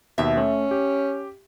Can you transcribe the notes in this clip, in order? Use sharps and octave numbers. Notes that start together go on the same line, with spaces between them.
D#2 B2 E5
A3 C#4
G4